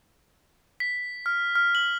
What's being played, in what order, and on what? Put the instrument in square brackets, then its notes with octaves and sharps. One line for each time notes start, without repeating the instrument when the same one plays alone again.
[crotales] B6
F6
F6
F#7